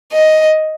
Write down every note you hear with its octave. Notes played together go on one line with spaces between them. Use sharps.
D#5